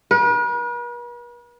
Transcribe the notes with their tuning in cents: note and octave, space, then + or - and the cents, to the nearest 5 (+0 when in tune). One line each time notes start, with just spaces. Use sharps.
B4 -45